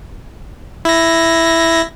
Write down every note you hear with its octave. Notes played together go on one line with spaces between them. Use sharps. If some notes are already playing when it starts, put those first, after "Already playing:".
E4 A#6